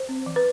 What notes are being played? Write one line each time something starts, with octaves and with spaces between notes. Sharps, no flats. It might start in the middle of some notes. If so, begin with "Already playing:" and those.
Already playing: C5
C4
E3
B4